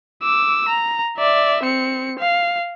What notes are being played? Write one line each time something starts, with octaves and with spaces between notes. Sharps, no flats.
D6 E6
A#5
D5 E5
C4 C#7
F5